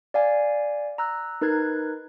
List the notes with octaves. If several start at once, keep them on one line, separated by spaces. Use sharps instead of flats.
D5 F5 G#5
A#5 E6 F#6
D#4 A#4 B4 F#6 G#6